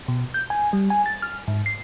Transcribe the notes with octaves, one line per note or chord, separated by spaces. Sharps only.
B2
G6
G#5
G3
G#5
A6
F6
G#2
C7